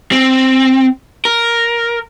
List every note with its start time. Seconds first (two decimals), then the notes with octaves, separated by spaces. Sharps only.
0.12 C4
1.25 A#4